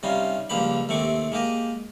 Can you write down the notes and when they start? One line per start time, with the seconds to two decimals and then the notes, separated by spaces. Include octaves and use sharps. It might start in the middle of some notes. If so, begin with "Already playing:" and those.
0.03 C3 G3 C#4 D#4 F4
0.50 C#2 G2 F3 A#3 G4 B5
0.89 D#2 C3 A3 C4 C#6 D6
1.32 G#3 A#3 G4 D#5